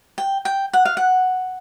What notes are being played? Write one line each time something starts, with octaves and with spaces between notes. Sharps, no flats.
G5
G5
F#5
F5
F#5